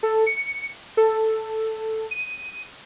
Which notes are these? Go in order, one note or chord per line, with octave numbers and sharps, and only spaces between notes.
A4
C#7
A4
D#7